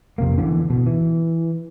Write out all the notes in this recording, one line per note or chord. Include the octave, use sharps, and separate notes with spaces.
F2 C3 A#3
D3 E3 A#3 B3
B2
E3